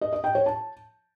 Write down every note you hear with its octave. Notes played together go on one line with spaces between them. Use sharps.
D#5
D#5
G5
C#5
A5